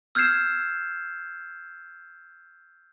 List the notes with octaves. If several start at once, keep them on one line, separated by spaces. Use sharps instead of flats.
E6 F6 G6 G#6 C7 E7